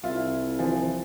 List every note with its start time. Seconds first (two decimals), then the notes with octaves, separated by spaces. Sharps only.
0.03 C2 E4 F4
0.59 E3 F3 C4